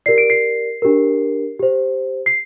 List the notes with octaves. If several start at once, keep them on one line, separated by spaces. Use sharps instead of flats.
G4 A#4 D5 C7
D7
C7
D4 G4 A#4
G4 C5
C7